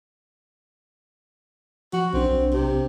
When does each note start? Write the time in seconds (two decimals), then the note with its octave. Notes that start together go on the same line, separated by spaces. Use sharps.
1.93 F3 F#4
2.14 B1 C4 D4
2.54 C3